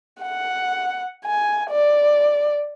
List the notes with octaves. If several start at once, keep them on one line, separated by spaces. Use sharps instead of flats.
F#5
G#5
D5